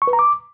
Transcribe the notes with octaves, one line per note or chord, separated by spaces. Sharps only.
C#6
B4
A#5
D6